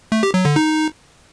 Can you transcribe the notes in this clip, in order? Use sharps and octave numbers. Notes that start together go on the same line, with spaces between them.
A3
G4
F#3
D3
D#4